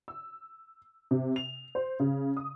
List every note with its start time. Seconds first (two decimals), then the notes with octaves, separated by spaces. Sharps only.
0.08 E6
1.11 C3
1.36 F7
1.75 C5
2.00 C#3
2.37 D#6